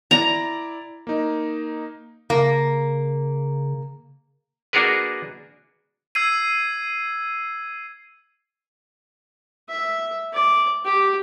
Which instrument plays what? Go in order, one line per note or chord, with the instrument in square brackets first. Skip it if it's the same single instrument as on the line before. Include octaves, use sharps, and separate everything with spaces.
[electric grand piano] E4 D5 [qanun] A#5
[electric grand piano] A#3 D#4
[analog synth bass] C#3 [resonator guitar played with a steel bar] A#3
[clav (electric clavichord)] A#3 D4 F#4 G#4 A#4 B4
[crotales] E6 G#6 C7 D#7
[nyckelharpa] E5
D5
G4